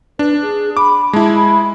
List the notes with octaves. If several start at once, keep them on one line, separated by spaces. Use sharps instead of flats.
D4 B4
G#4
B5 D6
G#3 E4 A5
B5